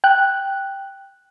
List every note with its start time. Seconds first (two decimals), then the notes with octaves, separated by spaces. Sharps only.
0.04 G5 F#6